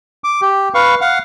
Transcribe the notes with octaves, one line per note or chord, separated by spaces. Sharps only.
D6
G4
B4 F5 C#6
F5 F#5